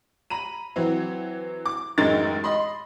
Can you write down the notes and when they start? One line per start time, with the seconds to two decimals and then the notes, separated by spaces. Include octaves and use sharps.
0.30 A#5 B5 D#7
0.76 E3 F#3 C4
1.66 D6
1.98 A1 F#2 G#3 D#4 A#4 A6
2.44 D#5 B5 C6